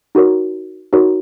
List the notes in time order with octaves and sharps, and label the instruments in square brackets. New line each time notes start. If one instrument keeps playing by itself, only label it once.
[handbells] D#4 F#4 A#4 C#5
D#4 F#4 A#4 C#5